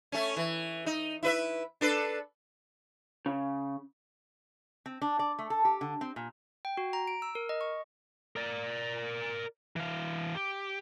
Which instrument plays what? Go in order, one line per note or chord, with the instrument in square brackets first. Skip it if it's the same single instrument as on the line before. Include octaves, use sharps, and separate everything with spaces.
[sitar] A3 C#4
E3
D#4
E4 B4 E5
D4 A4 B4
[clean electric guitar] C#3
[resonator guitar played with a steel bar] C4
D4
D5
A3
A4
G4
D3
C4
A#2
[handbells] G5
F#4
A#5
D7
E6
A#4
D#5
C#6
[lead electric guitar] A#4 D5
E3 F5
G4